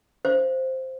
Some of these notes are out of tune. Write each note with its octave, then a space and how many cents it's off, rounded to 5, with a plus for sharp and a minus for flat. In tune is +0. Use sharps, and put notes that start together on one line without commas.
C5 +0 F5 -40